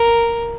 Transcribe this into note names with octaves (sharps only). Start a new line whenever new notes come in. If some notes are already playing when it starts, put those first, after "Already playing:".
Already playing: A#4